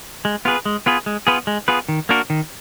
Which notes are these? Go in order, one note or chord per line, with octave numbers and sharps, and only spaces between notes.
G#3
B3 F4 G#4 B4
G#3
B3 F4 G#4 B4
G#3
B3 F4 G#4 B4
G#3
B3 F4 G#4 B4
D#3
A#3 D4 F#4 A#4
D#3